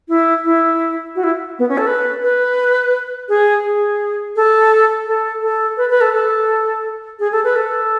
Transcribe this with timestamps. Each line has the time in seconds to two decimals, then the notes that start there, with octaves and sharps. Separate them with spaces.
0.09 E4
0.44 E4
1.16 F#4
1.24 E4
1.59 B3
1.69 C#4
1.78 A4
1.87 B4
2.22 B4
3.29 G#4
3.65 G#4
4.36 A4
5.07 A4
5.42 A4
5.77 B4
5.90 B4
6.01 A4
6.14 A4
7.19 G#4
7.32 A4
7.44 B4
7.56 A4